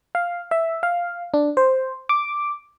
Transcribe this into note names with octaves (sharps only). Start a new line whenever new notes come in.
F5
E5
F5
D4
C5
D6